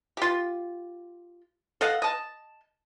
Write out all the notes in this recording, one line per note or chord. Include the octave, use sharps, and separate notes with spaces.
F4 G4
A4 D#5 F5 F#5
D#5 A5